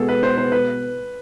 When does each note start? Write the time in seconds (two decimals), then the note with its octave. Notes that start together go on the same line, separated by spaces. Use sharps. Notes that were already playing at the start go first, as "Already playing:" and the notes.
Already playing: B2 G#3 B3 G#4 A4
0.09 B4
0.23 C5
0.38 C5
0.52 B4